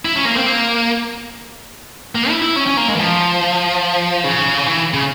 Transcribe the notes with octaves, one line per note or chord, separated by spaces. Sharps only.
E4
C#4
A#3
C4
A#3
A#3
E4
E4
C#4
C#4
A#3
G#3
E3
F3
C#3
E3
C#3